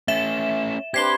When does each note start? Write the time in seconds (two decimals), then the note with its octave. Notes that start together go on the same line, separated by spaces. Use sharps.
0.08 A3 C#4 E5 E7
0.94 C4 D4 G4 B4 G#6 C7 G7